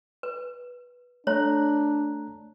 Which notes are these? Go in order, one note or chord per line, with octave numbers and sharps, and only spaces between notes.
B4
A3 D4 C#5 A#5 F#6